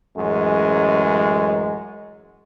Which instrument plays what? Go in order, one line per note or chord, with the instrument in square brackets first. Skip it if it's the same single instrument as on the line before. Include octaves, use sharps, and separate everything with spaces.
[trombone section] A1 F#2 G#3